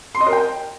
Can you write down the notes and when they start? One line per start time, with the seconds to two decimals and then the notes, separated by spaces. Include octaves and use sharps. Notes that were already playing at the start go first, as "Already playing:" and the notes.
0.15 C6
0.21 D#5
0.27 A#4
0.33 G5